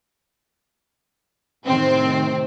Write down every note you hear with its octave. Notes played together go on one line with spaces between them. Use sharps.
A2 C3 D#3 C4